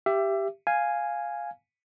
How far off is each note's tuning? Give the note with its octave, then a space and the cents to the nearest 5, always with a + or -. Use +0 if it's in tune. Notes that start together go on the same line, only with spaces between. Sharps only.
G4 +0 E5 +25
F5 +0 G#5 +0